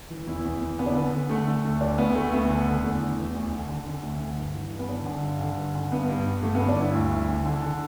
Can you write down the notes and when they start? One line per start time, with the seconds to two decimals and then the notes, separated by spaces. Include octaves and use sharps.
0.10 E3
0.27 E2 E4
0.45 E2
0.61 E2
0.79 D3 B3
0.86 D4
0.95 D3 B3
1.13 D3
1.29 D3 A3
1.48 D3
1.64 D2
1.81 D2 D4
1.98 D2 B3
2.15 D2 A3
2.33 D2 B3
2.50 D3
2.67 D3
2.83 E2 A3
3.02 E3
3.19 E2
3.35 D2
3.52 D3
3.69 D3
3.86 D3
4.03 D2
4.20 D3
4.37 G2
4.55 E3
4.72 G2
4.79 B3
4.89 D3 D4
5.06 D3
5.23 G2
5.41 D3
5.58 G2
5.75 D3
5.92 G2 B3
6.09 G2
6.26 G2
6.42 G2 A3
6.55 B3
6.60 D3
6.68 D4
6.77 G2 E4
6.94 D2
7.11 D2
7.29 D3
7.45 D3
7.62 D3